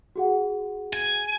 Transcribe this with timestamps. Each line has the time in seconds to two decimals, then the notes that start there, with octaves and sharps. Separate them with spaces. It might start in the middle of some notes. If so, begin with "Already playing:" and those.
0.16 F#4 G#4 F#5
0.93 G#5